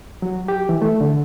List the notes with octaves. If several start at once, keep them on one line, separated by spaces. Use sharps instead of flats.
F#3
G4
E3
A3
D3